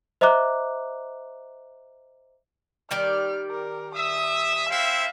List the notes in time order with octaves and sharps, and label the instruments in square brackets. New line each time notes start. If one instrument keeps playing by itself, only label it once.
[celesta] C5 D#5 E5 A#5 D6 F#6
[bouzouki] D#3 G3 D5 [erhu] F6
[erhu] A#4
[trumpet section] E5 [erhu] D#6
[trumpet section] C4 E4 E5 [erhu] F5